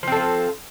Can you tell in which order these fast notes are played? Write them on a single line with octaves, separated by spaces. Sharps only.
F3 C4 A4 F4